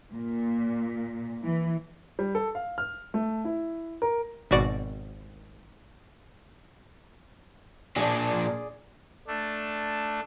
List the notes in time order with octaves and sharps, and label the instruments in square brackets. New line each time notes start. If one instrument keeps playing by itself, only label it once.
[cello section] A#2
E3
[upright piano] G3
A4
F5
F6
A3
E4
A#4
[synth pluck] G#1 B2 F#4 D5 D7
[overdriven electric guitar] A#2 D4 [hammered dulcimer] G#4 D5
[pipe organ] A3 D4